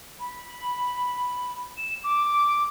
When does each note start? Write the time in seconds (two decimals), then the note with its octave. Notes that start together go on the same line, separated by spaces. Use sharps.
0.20 B5
1.77 E7
2.04 D6